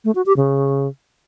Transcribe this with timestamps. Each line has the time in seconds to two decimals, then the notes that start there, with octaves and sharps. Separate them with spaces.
0.05 A3
0.15 F#4
0.26 G4
0.37 C#3